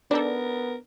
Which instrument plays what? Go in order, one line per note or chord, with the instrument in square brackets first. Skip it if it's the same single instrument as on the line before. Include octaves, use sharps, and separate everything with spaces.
[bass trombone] B3 [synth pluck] D4 A4 [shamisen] D#4 D5 [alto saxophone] A#4